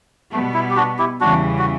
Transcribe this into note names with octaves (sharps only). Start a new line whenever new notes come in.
B2 G3 A3 B3
E4
G4
D4 F#4
E4 G4
E2 C#3 E3 G3 D4 F#4
F#4